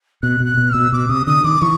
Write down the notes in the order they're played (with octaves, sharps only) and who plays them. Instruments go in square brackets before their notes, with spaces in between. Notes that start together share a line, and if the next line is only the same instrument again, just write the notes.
[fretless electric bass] B2 [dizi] F#6
[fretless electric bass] B2
[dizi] F#6
[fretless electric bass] B2
[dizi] F6
[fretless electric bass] B2 [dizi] E6
[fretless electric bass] B2 [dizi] D6
[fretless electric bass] C3 [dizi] D#6
[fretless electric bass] D3 [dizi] D#6
[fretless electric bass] D#3 [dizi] D6
[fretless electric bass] E3 [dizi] C#6